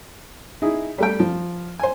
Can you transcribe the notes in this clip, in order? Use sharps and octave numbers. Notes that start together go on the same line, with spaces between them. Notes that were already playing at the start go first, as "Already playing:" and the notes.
D#4 E4 G#4
G3 A3 G5
F3
C5 G#5